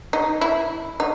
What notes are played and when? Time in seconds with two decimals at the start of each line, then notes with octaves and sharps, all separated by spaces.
0.13 D#4
0.41 E4
1.00 D#4